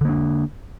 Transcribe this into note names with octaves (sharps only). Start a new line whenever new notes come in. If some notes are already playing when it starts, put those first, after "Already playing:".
D3 A#3 D4